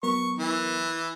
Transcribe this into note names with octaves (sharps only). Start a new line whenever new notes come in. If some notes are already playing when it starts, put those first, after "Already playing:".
F#3 B3 A#4 C#6
E3